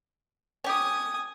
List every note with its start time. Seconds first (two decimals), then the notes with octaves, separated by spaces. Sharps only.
0.64 C#4 G4 G#5 D#6